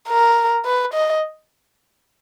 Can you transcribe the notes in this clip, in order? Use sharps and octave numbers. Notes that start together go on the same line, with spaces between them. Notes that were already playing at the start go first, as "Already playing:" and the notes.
A#4
B4
D#5